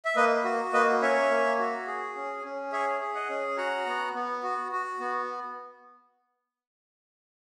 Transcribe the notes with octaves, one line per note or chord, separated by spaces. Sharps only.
E5
A#3 B4 D#5
F#4
A#3 B4 D#5
C#4 C#5 E5
A#3
F#4
G#4
C#4
C#4
G#4 C#5 E5
G#4
D#5 F#5
C#4
F#4 F#5 A#5
B3
B3
F#4
F#4
B3